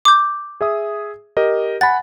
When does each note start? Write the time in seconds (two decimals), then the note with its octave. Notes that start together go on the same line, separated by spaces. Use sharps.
0.05 D6 G6
0.61 G#4 E5 D#6
1.37 G4 A#4 D#5
1.81 F#5 G#5 B5 A6